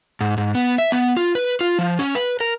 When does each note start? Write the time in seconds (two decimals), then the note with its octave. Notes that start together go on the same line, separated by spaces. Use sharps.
0.21 G#2
0.38 G#2
0.55 B3
0.78 E5
0.92 B3
1.17 F4
1.35 B4
1.61 F4
1.79 F3
1.99 C#4
2.15 B4
2.40 A#4